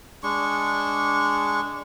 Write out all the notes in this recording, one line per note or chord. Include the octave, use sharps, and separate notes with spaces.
G#3 D4 C#6